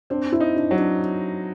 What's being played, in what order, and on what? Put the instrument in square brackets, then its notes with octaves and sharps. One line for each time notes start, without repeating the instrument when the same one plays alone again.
[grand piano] C4 [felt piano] D4
[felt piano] E4
[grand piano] D#4
[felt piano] D4
[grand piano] F#3
[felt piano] D4